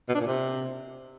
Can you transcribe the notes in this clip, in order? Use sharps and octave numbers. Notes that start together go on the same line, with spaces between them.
B2
D4
A#2
C3